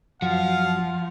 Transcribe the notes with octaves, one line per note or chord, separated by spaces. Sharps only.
F#2 F3 F#3 F5 F#5